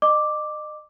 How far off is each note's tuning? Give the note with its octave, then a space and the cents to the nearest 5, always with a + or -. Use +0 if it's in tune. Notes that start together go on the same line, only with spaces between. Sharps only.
D#5 -35 D6 +0